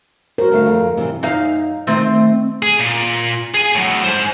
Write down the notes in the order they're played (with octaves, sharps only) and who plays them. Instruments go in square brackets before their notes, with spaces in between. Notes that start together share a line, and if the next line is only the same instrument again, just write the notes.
[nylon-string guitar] F#4 C5 [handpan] A#4
[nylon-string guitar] D3 A3 F5
F2
C3 D#3 E3
[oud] F#2 D#4 F5
D#3 A3 C4
[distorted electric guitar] G#4
A#2
G#4 G#5
A2 F#3
G#3 C5